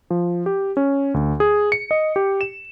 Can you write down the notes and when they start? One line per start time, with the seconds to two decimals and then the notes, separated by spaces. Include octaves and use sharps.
0.10 F3
0.46 G4
0.77 C#4
1.14 D2
1.40 G#4
1.72 C#7
1.91 D#5
2.16 G4
2.41 E7